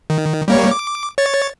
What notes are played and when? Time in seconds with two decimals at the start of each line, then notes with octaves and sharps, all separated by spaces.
0.10 D#3
0.48 G3 A#3 C#5
0.71 D6
1.18 C#5 A6